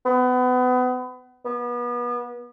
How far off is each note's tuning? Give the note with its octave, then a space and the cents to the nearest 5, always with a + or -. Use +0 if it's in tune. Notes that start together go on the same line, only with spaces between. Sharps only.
B3 +30
B3 -30